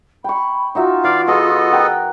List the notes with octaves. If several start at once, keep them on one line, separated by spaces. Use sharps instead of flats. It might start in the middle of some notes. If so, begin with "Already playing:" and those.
G5 B5 C#6
D#4 F4 F#4 E5
E3 D5 F5
B3 G#4 A4 D#5
A#4 F#5 G5